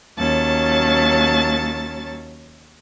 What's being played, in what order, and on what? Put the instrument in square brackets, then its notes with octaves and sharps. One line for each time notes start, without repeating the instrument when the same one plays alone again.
[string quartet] D#2 F#3 C#4 A5 A6